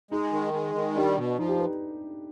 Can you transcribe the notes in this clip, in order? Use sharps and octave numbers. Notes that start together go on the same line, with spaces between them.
G#3 D#4
D#3
G#3
D#3
G3 D4
B2
F3 D#4
G4
B4